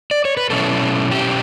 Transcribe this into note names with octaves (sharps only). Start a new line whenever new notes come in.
D5
C#5
B4
B2 F#3 C#4 E4 A4
G4